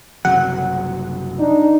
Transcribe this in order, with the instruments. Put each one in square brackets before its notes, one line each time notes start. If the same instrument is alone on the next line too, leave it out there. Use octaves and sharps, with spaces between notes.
[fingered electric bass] F#1 C2 F#3 [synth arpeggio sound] F#5
[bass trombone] D4 [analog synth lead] D#4